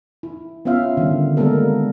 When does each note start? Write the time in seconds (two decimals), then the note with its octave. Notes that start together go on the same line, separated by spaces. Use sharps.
0.23 E4
0.65 B3 C#4 F4 E5 F5
0.97 D3 D#3 G3
1.37 G3 G#3 A#3 B3 A4 A#4